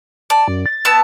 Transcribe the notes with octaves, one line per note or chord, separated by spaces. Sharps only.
D5 A5
F#2
A6
B3 A5 E6